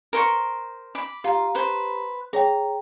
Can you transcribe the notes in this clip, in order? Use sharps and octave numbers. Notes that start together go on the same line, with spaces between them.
A#4 C5 C#6
B5 D6
F4 G4 A#5
B4 C5
G#4 C#5 G5 A#5